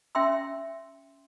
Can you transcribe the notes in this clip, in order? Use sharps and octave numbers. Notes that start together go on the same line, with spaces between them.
C#4 E5 G5 C6 E6